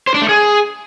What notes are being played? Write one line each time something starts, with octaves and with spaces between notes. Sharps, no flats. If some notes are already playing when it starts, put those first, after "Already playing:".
C5
D4
A3
G#4